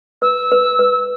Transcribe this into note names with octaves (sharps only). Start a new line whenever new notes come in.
B4 E6
B4
B4